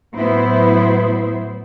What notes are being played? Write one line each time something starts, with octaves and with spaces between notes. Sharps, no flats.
A2 F#3 B3 E4 C5